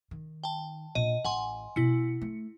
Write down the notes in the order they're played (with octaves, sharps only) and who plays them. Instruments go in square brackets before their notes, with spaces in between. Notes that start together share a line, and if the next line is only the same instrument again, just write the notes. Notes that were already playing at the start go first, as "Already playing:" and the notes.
[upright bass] D#3
[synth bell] G5 A5
[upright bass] A#2 D4 [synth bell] D#5
[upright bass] A1 [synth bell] F#5 G#5 C6
[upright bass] B2 [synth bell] E4 C#7
[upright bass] A3